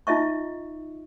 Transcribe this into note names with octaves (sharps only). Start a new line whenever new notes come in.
D#4 F4 D#5 E5 C#6